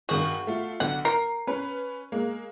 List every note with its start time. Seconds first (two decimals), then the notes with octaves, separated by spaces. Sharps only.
0.09 G2 D#3 F#4 G#4
0.47 A3 F4
0.80 B1 D3 F#5
1.05 A#4 C7
1.47 C#4 B4
2.12 G#3 A#3